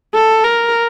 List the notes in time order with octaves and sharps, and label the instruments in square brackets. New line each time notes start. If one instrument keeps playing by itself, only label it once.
[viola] A4
A#4